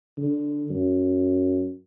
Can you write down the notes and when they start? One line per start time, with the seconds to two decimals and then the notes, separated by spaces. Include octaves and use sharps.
0.18 D3
0.70 F#2